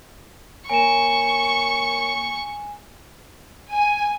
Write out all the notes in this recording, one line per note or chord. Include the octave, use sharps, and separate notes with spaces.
A#3 A#4 C#5 G#5 C#6 E7
G#5